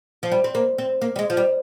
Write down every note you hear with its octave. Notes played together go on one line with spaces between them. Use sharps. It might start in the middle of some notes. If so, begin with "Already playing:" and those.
F3
G3
C4
A#3
C4
A#3
G3
G#3
F3
G3